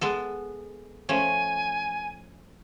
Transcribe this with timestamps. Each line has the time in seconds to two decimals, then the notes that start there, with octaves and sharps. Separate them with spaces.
0.01 G#3 B3 A4
1.09 F3 A3 C#4 G#5